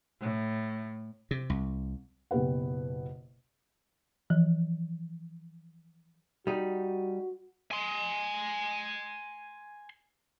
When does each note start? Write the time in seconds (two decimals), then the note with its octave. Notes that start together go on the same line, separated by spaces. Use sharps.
0.21 A2
1.31 C3
1.50 C2
2.31 F#1 B2 G4 B4 F#5
4.30 E3 F3
6.47 G3 D#4 F#4
7.71 G#5 C6